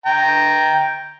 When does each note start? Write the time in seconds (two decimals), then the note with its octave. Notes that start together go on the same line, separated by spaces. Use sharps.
0.06 G5 A#5